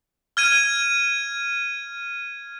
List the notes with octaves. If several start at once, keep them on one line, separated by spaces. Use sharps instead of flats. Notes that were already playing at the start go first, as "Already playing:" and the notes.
F6 G#6 D#7